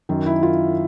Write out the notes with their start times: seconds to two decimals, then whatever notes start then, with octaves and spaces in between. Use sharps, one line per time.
0.09 F#2 D#3
0.26 E4
0.43 F4